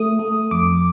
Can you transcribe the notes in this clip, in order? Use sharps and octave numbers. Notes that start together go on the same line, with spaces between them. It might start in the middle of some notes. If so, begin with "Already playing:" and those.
Already playing: A3 D#6
A3
F2 D6